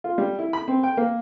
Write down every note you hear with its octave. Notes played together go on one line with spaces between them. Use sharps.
F4
G3
E4
B5
C4
G5
A#3